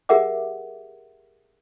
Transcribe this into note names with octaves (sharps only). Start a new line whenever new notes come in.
G4 G#4 A#4 E5 F#5 D6